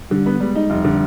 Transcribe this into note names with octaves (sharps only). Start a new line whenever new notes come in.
D3 G3
B3
G3 G#3
D#4
F1 G3
D3